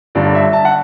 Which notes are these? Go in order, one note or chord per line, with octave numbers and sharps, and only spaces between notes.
G1 G2 D3 D5
E5
A5
F#5